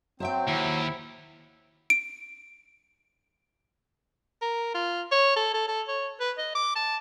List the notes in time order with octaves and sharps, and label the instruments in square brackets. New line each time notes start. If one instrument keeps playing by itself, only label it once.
[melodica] F#3 [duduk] C4 [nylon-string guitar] C5 E5 G5
[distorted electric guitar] D#2 [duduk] E4
[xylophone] D7
[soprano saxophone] A#4
F4
C#5
A4
A4
A4
C#5
B4
D#5
D6
A5